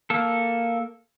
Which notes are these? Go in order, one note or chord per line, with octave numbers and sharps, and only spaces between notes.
A#3 A4